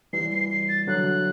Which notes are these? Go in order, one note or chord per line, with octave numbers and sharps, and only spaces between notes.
E3 G3 C7
C7
C7
A6
D3 F#3 F#6